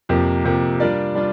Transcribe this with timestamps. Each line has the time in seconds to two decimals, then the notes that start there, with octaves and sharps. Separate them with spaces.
0.09 F2 C3 F3 A#3 G4
0.44 F2 C3 F3 A#3 G4
0.80 G3 D4 F4 A#4 D5
1.15 G3 D4 F4